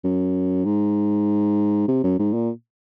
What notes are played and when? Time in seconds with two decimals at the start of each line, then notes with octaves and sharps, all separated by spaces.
0.04 F#2
0.65 G#2
1.88 C3
2.04 F#2
2.19 G#2
2.34 A#2